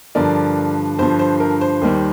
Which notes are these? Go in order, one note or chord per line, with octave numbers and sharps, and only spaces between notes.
G2 D3 F3 A#4 D5
G2 D3 F3 C5
C5
A#4
C5
D#2 D#3 G3